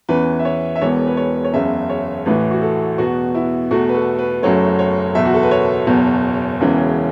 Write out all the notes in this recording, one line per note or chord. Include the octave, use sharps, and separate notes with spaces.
E2 E3 C#4 B4
E5
C#5
E5
E1 E2 E3 B3 C#5
B4
C#5
C#5
F#1 E2 C#3 E5
C#5
A1 A2 E3 B4
F#4
A4
E2 B2 B3 F#4
E4
E2 B2 A3 F#4
B4
A4
B4
F#1 F#2 F#3 A3 C#5
C#5
F#1 E2 B2 E5
F#4
A4
B4
C#5
F#1 E2 B2
E1 E2 C#3 E3